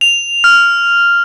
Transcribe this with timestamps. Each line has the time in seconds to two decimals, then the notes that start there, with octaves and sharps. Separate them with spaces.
0.01 F7
0.44 F6